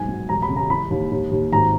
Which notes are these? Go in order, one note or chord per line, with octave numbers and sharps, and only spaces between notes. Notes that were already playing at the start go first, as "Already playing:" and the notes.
Already playing: B1 G#2 G#5
F#3
E1 A#5
B5
C#3
A#5
E3 B5
D#2
D#2
D#2
G#1 A#5